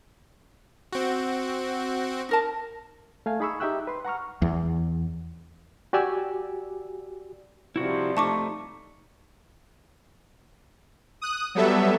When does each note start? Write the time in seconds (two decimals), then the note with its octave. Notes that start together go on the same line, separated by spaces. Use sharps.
0.93 C4 F#4
2.29 D#4 A#4 A5
3.26 A3 F5 G#5
3.40 D#4 G#4 B5 C#6 E6
3.60 D#4 G4 E5 G5 E6 F#6
3.87 B4 C6
4.05 F#5 A#5 C#6 F6
4.42 E2
5.93 F#4 G4 D5 G#5 E6
7.76 C3 F3 G3 E4 F#4
8.17 A3 D#4 A5 C#6 D6
11.21 D#6 F#6
11.55 F#3 G3 B3 A4 E5